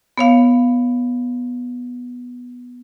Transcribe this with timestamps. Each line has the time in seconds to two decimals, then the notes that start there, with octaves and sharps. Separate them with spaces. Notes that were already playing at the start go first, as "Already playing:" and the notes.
0.18 B3 C#5 F5